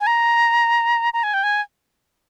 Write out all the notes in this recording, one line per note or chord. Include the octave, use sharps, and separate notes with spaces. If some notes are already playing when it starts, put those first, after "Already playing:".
G#5
A#5
A#5
G#5
G5
G#5